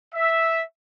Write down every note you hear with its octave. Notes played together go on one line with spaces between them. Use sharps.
E5